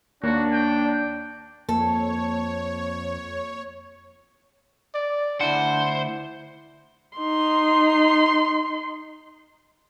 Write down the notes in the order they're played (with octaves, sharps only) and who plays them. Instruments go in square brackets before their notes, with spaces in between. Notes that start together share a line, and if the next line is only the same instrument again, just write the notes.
[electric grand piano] D#2 A#3 C#5 [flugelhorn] D4 [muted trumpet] F#4
[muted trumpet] G5
[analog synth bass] F2 [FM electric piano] A#3 [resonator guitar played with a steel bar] A4 [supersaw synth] C#5
[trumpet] D5
[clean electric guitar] D2 E4 F#5 [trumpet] D4 [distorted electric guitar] C5
[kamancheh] D#4 C6